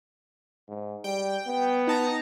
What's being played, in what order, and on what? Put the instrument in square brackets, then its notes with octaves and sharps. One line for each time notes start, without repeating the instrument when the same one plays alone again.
[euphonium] G#2
[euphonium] G3 [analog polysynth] G5
[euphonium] B3
[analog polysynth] D#4 A5 A#5